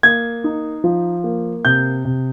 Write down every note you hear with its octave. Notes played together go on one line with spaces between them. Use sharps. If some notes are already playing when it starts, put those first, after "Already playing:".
A#3 G#6
D#4
F3
A#3
C3 G6
C3